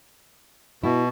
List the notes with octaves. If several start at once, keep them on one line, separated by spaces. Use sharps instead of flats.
B2 E4 F#4